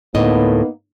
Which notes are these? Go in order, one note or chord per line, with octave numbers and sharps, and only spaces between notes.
D2 A2 A#3 B3 D#4 D#5